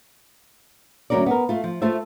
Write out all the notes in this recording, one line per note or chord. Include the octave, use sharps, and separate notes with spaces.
D2 F#3 G#3 C#4 A#4 D5
B3 A#4
A3 F4
F3
A3 F4 A4 C5 E5